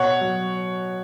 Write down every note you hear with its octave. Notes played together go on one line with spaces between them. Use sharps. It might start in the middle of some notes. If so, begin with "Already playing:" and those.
Already playing: B2 C#5 F#5
F#3